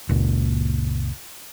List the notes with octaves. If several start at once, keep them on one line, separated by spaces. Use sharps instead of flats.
F#1 C#2 A#2